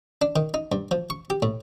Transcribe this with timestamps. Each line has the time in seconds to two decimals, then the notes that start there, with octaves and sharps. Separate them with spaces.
0.22 D4
0.36 D#3
0.54 D#4
0.72 G2
0.91 F3
1.10 C#6
1.30 G4
1.42 A2